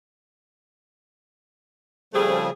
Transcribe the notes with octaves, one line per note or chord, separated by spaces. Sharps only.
C#3 F3 G3 A3 C4 G#4